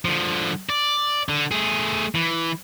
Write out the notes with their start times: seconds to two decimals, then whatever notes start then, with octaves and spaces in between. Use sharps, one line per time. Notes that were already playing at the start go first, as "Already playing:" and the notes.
0.05 D3 F3
0.70 D5
1.29 D3
1.51 A3 G#4
2.15 E3